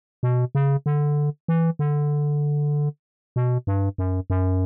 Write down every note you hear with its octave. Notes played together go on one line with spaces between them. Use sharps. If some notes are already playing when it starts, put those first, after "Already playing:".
B2
C#3
D3
E3
D3
B2
G2
F#2
F#2